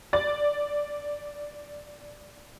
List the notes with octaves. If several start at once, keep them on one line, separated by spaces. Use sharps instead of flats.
D5 A6